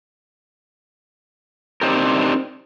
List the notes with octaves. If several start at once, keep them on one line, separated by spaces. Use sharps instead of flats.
C4 D4 D#4 G4 A#4